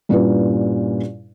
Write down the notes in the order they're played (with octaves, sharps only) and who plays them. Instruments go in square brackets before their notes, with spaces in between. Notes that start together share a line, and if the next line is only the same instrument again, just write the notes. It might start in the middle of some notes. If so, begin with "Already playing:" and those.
[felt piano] G2 A#2 C#4 D4 E4 B4